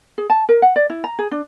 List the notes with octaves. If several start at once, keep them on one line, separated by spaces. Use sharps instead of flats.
G#4
A5
A#4
F#5
D5
E4
A#5
G#4
D4